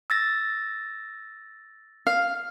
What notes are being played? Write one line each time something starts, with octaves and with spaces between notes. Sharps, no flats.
E6 A6 A#6
F5